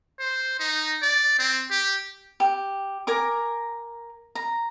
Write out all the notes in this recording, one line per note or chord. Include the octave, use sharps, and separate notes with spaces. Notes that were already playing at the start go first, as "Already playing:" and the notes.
C5
D#4
D5
C4
G4
G4
A#4 G#5 D6
A#5